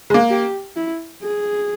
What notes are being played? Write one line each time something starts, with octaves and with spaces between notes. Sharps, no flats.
G#3
A#3
G4
E4
G#4